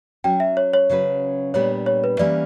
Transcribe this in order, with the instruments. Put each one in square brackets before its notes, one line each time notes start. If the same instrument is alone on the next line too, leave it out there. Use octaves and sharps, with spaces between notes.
[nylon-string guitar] F#3 C#4 F#4 [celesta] G5
[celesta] E5
C#5
C#5
[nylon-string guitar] C#3 F#3 C#4 F#4 B4
[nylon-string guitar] A#2 G3 B3 D4 [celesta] C#5
[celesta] C#5
B4
[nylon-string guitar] E3 G3 A#3 C#4 [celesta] D5